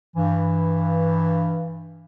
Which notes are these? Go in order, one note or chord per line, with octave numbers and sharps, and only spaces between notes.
G2 E3